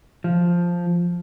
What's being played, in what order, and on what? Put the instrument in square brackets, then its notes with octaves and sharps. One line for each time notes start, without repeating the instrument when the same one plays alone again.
[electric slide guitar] F3